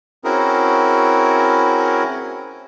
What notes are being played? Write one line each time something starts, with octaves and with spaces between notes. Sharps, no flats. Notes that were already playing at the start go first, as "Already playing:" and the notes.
C4 C#4 E4 F#4 G#4 A#4